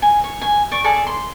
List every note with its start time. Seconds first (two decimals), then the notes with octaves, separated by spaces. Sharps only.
0.02 G#5
0.24 C#5
0.41 G#5
0.71 D5 C#6
0.84 G#4 A4 D5 A5
1.07 C6